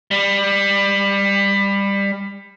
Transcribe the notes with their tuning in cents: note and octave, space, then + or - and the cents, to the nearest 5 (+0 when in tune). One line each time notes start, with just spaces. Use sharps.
G3 +20